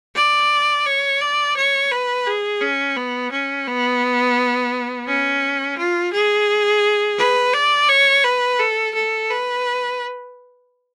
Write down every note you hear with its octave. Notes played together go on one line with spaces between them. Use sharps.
D5
C#5
D5
C#5
B4
G#4
C#4
B3
C#4
B3
C#4
F4
G#4
B4
D5
C#5
B4
A4
A4
B4